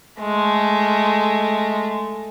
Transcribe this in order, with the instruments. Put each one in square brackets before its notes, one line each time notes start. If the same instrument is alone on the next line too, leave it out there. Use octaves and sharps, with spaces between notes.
[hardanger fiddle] G#3 A3